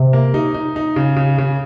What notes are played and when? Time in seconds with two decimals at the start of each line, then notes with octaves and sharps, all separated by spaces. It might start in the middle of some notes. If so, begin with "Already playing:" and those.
Already playing: C3
0.13 A#3
0.34 D#4
0.54 D#4
0.76 D#4
0.96 C#3
1.16 C#3
1.38 C#3